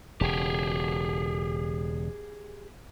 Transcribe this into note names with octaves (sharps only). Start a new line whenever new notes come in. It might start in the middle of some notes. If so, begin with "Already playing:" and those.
E1 C#3 G4 G#4